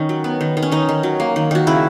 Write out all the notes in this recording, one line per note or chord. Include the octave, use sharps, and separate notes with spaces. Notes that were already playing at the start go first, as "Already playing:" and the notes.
Already playing: D#3 C#4 D#4
F#3
B3
D#3
D#3
C#4
D#3 D#4
D#3
F#3
A#3
D#3
D#3 F#4
C#3 E4